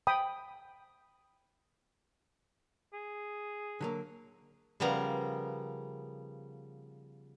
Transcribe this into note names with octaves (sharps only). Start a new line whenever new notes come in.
G5 B5 D#6
G#4
D3 F#3 A#3
C#3 F3 G3 B3 A#4